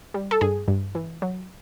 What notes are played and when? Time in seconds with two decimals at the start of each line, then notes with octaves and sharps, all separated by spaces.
0.14 G3
0.31 A4
0.41 G2 G#4
0.68 G2
0.95 E3
1.22 F#3